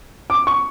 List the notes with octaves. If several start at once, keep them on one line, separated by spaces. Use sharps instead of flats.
D6
C#6